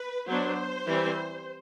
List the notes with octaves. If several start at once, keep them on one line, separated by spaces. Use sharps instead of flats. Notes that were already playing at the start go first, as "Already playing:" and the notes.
Already playing: B4
F#3 B3 D4 C5
E3 G3 C4